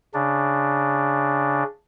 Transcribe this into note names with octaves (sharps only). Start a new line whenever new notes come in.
C#3 D4